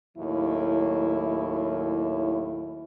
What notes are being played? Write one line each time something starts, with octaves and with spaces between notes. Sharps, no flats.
D#2 A2 F#3 E4